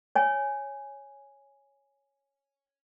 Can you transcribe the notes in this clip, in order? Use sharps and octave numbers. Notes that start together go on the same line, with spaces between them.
C#5 G#5